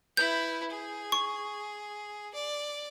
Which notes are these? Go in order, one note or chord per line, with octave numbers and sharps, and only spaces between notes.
E4 B4 G6
G#4
C#6
D5